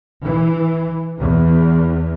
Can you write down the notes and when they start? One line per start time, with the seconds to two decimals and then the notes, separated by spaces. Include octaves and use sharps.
0.23 E3
1.19 E2